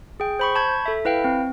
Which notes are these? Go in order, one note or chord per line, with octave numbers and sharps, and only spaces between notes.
G#4 G5
C5 B5 C#6
A5 B5 C#6 G6 G#6
A4 E5
E4 B4 F5 G5
C4